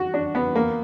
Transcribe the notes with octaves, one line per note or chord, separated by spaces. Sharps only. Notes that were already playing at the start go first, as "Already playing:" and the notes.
Already playing: F#4
D4
B3
A#3